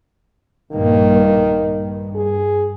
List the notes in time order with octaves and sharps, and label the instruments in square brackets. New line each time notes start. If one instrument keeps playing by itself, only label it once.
[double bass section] A#1 G2 A#3 [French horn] D#3
[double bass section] G2
[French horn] G#4